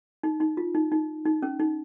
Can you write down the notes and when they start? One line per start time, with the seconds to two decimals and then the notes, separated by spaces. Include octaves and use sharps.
0.23 D#4
0.40 D#4
0.57 F4
0.75 D#4
0.92 D#4
1.25 D#4
1.42 C#4
1.59 D#4